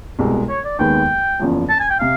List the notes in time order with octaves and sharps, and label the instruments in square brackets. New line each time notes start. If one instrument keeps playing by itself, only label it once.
[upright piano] C2 B2 G#3
[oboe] C#5
D5
[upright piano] D#2 D#3 G#3 B3 [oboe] G5
[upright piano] F#1 E2 C#3 F3
[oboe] A5
G#5
G5
[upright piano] C3 [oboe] F5